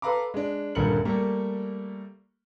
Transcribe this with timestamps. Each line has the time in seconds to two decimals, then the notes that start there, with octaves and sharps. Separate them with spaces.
0.02 A4 B4 F5 A#5 B5 D6
0.34 G#3 D4
0.75 D#1 G2 D3 A#4 C#7 F#7
1.05 G3 A3 A#3